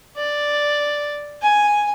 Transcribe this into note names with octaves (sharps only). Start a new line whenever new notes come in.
D5
G#5